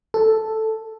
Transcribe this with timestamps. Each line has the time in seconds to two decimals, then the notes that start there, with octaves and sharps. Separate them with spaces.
0.14 A4